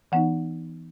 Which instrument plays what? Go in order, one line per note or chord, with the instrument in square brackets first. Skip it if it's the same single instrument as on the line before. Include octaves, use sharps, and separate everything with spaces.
[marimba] E3 B3 D#4 F#5